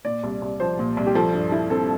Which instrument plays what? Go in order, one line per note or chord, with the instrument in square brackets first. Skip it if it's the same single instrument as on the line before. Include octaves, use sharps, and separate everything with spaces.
[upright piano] A#2 [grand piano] D5
[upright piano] C2
C2
[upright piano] F3 [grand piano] C5
[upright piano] A#2
C2
[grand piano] G4
[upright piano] F3 [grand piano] A4
[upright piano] G2
E4
[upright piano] C4 [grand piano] A4